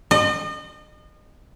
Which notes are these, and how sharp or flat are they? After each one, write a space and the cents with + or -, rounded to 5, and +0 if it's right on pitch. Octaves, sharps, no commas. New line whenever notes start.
D#5 -35